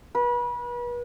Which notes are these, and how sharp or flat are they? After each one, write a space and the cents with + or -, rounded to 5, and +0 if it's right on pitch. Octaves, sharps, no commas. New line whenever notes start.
B4 -35